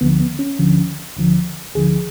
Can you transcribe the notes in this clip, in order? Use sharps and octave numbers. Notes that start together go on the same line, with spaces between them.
D2 D3 F3 B3
B3
C#4
D2 D3 F3
D2 D3 F3
D2 D3 F3 G#4